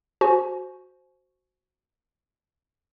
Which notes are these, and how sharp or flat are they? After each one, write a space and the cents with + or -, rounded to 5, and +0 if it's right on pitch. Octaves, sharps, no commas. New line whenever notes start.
F#4 -5 C5 +0 G#5 +30